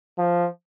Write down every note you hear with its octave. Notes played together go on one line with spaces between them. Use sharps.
F3